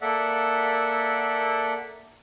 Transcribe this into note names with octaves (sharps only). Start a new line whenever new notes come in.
A#3 A4 D5 E5 F#5